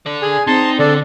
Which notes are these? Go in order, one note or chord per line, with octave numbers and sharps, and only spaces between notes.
A4 D5
G#4 G#5
C4 D#4 A5 C6
D3 D4 A4 D5